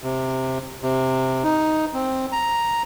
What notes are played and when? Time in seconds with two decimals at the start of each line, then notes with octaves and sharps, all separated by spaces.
0.04 C3
0.83 C3
1.44 D#4
1.94 C4
2.32 A#5